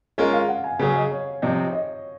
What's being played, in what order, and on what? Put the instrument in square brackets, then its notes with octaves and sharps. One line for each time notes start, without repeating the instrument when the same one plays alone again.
[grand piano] G#3 C#4 F4 A#4 [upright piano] D#5
[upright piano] F5
F#5
G#5
[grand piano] C#3 F#3 C#4 G#4 [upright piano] G#5
[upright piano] D#5
C#5
[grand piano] C3 F3 C4 D#4
[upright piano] D#5